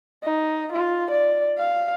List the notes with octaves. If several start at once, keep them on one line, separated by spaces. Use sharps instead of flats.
D#4
F4
D5
F5